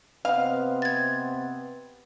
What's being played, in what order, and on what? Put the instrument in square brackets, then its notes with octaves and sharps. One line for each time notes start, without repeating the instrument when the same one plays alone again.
[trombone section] C3 B3 C4 [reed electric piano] B4 D#5 F#5 [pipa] F5
[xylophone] G#6 A6